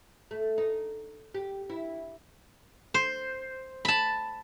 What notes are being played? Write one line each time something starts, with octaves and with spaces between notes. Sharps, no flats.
A3
D#4
G4
E4
C5
A5 B5